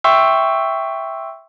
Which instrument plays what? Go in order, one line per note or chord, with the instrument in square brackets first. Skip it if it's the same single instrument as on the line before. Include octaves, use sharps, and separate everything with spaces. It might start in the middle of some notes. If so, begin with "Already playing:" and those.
[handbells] E5 G5 C6 C#6 E6